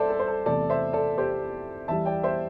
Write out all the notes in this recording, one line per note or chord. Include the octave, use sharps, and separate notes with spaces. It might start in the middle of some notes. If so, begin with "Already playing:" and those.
Already playing: C2 A4 C5 D5 E5
A4
C5
A4
E2 C3 A3 A4 D5
C5 E5
A4 D5
G4 C5
E2 E3 G3 E5 A5
D5 G5
C5 E5